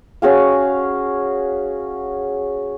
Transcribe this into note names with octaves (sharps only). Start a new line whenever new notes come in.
C#4 F#4 G#4 F5